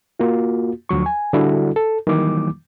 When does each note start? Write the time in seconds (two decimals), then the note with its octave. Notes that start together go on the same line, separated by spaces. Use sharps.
0.20 A#3 F4 F#4
0.89 D2 F3 F#3 C#6
1.06 G#5
1.33 D3 G3 D4 E4 F#4 A4
1.76 A4
2.07 D#3 E3 F#3 G3 A#3 D6